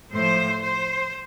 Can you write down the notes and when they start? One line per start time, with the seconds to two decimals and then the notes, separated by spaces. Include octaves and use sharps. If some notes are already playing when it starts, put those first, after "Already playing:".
0.13 A2 F3 C5
0.62 C5